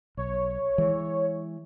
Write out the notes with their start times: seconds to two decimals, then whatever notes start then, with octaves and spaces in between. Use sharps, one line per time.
0.17 B1 C#5
0.78 E3 G#3